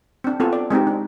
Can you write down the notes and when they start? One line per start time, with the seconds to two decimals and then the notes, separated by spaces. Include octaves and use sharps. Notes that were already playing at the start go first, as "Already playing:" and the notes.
0.24 C4 D4
0.40 B3 C4 F4 F#4 A4
0.53 D5
0.71 G#3 C4 D#4 G4
0.87 D4